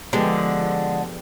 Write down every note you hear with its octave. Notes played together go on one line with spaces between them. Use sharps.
D3 F3 G#3 B3 G4 G#4